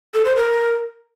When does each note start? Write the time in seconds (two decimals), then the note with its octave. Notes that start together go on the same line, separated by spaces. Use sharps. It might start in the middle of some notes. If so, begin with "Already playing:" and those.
0.14 A4
0.25 C5
0.36 A#4